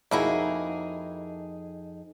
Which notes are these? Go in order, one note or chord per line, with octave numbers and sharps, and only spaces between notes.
F2 A#3 D#4 E4 F#4 G#4